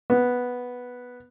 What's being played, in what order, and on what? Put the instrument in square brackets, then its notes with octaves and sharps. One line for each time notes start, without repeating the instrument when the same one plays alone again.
[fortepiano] B3